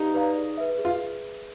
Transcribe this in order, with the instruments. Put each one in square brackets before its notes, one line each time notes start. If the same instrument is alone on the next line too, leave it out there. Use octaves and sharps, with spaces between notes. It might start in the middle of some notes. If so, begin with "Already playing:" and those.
Already playing: [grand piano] D#4 [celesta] G4 B4 D5 F5 A#5
[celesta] B4 D5 F5 A#5
G#4
B4 E5
G#4
[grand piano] F4